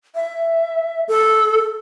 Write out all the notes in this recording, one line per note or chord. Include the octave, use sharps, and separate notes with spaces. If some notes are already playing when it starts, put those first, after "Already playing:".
E5
A4